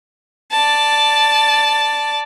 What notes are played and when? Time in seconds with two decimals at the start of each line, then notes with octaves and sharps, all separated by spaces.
0.52 D5 A5